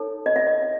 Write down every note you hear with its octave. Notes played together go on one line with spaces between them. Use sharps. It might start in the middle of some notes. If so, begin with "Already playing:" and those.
Already playing: D#4 A4 C#5
D#5
E5
D#5
E5